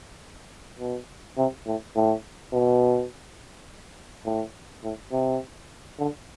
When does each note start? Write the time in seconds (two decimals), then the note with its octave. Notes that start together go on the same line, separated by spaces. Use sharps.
0.79 B2
1.37 C3
1.66 A2
1.96 A2
2.53 B2
4.25 A2
4.83 A2
5.12 C3
5.99 D3